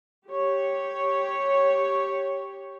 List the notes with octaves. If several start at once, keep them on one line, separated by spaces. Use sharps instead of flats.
G4 C#5